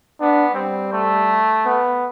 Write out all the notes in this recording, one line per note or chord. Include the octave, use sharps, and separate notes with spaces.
B3 D4
G3 C4
A3
B3